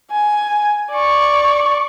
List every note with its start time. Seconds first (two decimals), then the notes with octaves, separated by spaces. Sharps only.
0.12 G#5
0.91 D5 C#6